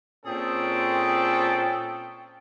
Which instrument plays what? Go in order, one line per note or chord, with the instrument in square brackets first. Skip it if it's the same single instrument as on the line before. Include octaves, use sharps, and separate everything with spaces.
[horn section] A#2 C4 C#4 G#4 A4 G5